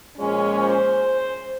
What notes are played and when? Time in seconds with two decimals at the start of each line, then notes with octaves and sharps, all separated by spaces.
0.17 A#2 F3 G#3 C#4
0.58 C5